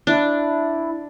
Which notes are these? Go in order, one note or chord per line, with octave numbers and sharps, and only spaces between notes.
D4 E4